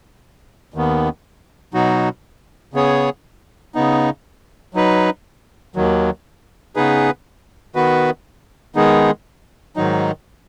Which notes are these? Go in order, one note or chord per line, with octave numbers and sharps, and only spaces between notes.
D#2 D#3 B3
B2 F#3 D#4 F#4
C#3 B3 G#4 C#5
C#3 B3 D#4
F#3 D#4 B4
D#2 D#3 F#3
C#3 B3 D#4 G#4 B4
D#3 B3 F#4 B4
D#3 G#3 B3 D#4 G#4
G#2 D#3 F#3 D#4